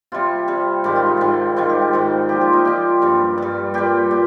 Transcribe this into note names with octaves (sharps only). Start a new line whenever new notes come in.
C3 G3 F4
C3 G3
G#2 D#3 G3 G4
F4
D#4
G#2 D#3 G3 F4
G#2 D#3 G3 F4
G4
F4
G#2 D#3 G3
A#2 F3 G4
F4
D#4
A#2 F3 G4
G2 G3
G2 G3
A#2 G3 G4
A#2